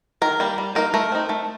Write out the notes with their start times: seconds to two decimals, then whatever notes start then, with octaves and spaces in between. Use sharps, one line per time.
0.22 D#3 A#4
0.40 G3 A#3
0.58 G3
0.75 A#3 D#4 A#4
0.94 A3 A#4
1.12 C4 D#4
1.29 A3